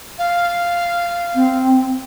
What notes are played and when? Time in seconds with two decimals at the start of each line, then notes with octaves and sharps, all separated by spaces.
0.19 F5
1.35 C4